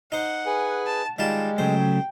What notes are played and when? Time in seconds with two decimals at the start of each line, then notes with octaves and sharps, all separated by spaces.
0.12 D#4 C5 F#5
0.47 G#4 B4 G#5
0.86 A5
1.19 D#3 G3 G#3 F4 A5
1.58 C#3 F#3 A3 C5 G5